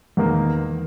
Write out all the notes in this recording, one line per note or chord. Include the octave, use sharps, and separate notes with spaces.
E2 D#3 A#3